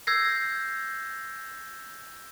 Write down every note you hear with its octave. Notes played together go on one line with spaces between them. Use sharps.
E6 G6 G#6 A#6 C7